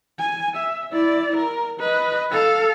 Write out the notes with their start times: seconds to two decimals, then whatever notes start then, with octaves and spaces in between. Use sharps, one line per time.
0.19 G#5
0.56 E5
0.92 E4 D5
1.36 A#4
1.80 B4 D#5
2.31 A4 F5